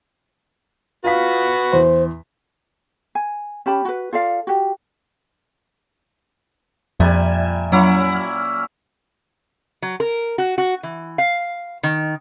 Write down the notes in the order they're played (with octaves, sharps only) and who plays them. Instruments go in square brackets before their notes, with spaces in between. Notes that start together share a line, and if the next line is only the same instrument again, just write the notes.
[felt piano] F4 F5 B6 [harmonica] F#4 B4
[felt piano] E2 C6 [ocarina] C5
[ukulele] G#5
C#4 G4 A5 B5
F#4 B4
F4 A4 D5 F5
F#4 G4
[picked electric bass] F2 [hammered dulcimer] A#2 G3 G#5 [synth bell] E5
[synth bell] F#3 F#5 F6 [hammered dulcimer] A#3 C#4 E4
[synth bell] F6
[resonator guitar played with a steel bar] F#3
A#4
F#4
F#4
E3
F5
D#3